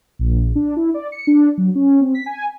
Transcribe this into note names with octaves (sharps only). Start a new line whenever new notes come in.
A#1
D4
E4
D5
C#7
D4
F#3
C#4
C4
B6
G#5